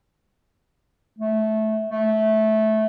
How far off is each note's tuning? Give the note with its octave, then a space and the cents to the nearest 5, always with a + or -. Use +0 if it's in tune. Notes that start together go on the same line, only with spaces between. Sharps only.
A3 -15
A3 -15